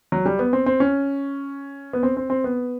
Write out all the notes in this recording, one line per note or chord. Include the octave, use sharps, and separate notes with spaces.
F#3
G3
B3
C4
C4
C#4
B3
C4
C4
C4
B3